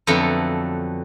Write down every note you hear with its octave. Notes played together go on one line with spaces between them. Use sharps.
F2 D3 F#3 A3 B3